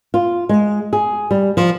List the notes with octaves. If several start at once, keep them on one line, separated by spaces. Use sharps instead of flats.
F4
G#3
G#4
G3
F3